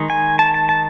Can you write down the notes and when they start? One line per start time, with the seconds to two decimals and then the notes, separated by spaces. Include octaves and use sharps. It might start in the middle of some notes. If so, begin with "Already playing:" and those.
Already playing: D#3 G#3 D#4
0.10 G#5
0.39 A5
0.54 A5
0.69 A5